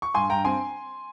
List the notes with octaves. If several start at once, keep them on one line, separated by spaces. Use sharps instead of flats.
C#6
G2 G#5 C6
G2 G5 A#5
C4 G#5 C6